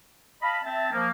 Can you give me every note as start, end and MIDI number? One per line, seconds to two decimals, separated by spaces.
0.41 0.58 75
0.41 0.58 77
0.41 0.58 81
0.41 0.58 83
0.64 0.88 60
0.64 0.88 76
0.64 0.88 81
0.92 1.09 53
0.92 1.09 58